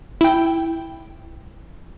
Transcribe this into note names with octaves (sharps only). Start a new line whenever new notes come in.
E4 G5